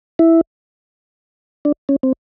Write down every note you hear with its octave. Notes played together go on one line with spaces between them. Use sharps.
E4
D4
C#4
C4